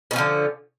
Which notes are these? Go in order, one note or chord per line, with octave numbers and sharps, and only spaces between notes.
B2 D3 F3 C#4